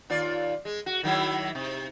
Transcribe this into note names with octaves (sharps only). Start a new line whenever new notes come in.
D#2 F4 D5
G#3
F#4
D#3 F#3 E4
C3